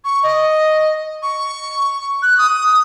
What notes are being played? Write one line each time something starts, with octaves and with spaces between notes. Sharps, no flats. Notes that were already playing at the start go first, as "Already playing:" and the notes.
C#6
D#5
C#6
F#6
D#6